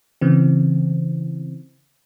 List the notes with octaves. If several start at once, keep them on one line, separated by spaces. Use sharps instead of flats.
C#3 E3 C4